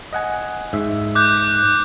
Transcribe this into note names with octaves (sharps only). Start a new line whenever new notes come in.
D#5 F#5 G#5
G#2 E5
D6 F#6 G6